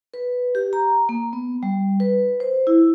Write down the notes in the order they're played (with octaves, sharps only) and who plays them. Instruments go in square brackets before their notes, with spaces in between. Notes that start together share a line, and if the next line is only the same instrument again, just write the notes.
[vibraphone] B4
G4
A#5
A#3
B3
G3
B4
C5
E4